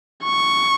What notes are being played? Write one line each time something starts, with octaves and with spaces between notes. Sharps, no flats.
C#6